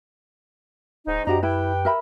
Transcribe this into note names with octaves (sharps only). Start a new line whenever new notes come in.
D1 G#2 D#4
F#2 C3 D4 F#4 G4 D#5 A#5
E4 G4 B4 G5
A#4 E5 B5